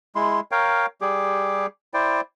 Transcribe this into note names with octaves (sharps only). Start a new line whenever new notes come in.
G#3 E4 C6
A#4 C#5 F5 G5
G3 G4 G#4 D6
E4 C5 D5 G5